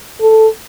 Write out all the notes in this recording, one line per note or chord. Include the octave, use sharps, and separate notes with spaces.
A4